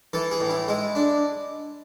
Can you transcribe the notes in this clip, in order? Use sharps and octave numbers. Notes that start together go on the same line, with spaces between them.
E3 A4
G#4
A2
E4
G#3 E4
D4